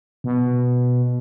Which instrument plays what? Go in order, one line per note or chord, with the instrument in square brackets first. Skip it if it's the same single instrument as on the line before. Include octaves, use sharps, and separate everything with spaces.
[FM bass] B2